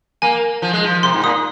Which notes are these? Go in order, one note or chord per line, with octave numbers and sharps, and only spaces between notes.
A#3 G#5
F3
G#3
F3
C3 C6
G#2
A#2 D#6